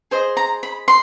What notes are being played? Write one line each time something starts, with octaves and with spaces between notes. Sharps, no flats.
G#4 C5 D#5
A#5
B5
C6